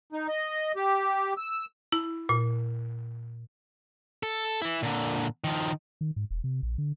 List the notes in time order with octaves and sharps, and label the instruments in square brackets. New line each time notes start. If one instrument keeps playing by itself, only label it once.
[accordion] D#4
D#5
G4
E6
[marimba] E4
A#2
[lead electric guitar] A4
E3 E4
A#2 D3
D#3 F3
[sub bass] D#3
G#2
E1
C3
A#1
D3